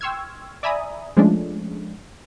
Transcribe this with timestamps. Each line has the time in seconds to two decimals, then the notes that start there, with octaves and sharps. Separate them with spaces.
0.01 G5 C6 C#6 E6 F6 G#6
0.63 D5 E5 G#5 A#5 B5 D#6
1.17 F3 G#3 A3 C#4 D4